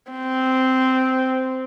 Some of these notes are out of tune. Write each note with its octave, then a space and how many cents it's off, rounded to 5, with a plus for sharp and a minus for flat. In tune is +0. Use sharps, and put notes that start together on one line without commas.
C4 -10